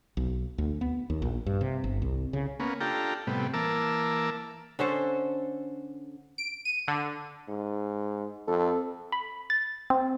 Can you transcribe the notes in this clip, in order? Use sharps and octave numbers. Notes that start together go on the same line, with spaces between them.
B1
D2
B3
D#2
A#1
G2
C3
G1
C2
C#3
A#3 B3 C#4
D4 F4 G4 A4 G5 A#5
A2 C3 G3 B3
E3 A#3 A#4 A5 D6 E6
D3 C#4 A4 C5
D7
D#7
D3
G#2
F2 A4
B5
A6
C4